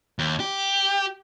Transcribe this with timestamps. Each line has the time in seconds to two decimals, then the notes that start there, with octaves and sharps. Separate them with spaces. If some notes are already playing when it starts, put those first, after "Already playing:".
0.19 D#2
0.40 G4